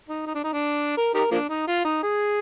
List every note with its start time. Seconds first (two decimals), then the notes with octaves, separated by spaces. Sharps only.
0.09 D#4
0.27 D#4
0.35 D4
0.43 D#4
0.53 D4
0.97 A#4
1.14 D#4 G4 A#4
1.31 F3 A#3 D4
1.49 D#4
1.67 F4
1.84 D#4
2.03 G#4